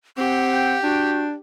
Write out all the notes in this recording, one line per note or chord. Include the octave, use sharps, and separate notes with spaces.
C4 G4 F#5
G5
D4 F#4